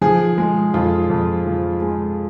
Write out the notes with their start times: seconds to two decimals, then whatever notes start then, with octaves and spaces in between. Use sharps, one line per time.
0.01 F3 G#4
0.38 G#3
0.74 F2 F4
1.10 F2
1.46 F3
1.82 G#3